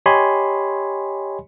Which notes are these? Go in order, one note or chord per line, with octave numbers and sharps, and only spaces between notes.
G4 C#5 D#5 G#5 B5 C6